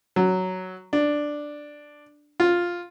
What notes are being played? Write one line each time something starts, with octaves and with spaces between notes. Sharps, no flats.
F#3
D4
F4